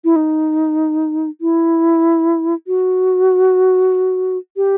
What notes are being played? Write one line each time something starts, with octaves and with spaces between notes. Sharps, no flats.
E4
D#4
E4
F#4
G4